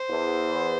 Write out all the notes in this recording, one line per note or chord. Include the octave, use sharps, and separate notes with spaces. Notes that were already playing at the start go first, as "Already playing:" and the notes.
Already playing: C5
E2